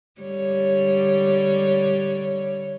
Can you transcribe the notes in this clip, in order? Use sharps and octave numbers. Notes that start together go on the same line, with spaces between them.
D3 G3 C#5